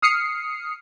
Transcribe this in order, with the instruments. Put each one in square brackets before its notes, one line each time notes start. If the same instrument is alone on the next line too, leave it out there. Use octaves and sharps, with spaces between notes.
[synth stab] D#6 F6 C7 C#7